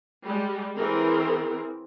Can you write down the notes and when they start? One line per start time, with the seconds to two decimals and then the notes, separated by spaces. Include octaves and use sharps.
0.25 G3 G#3 G4
0.77 E3 C4 G#4 A#4